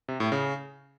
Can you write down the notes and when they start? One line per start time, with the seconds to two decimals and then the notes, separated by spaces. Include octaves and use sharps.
0.08 C3
0.20 A2
0.32 C#3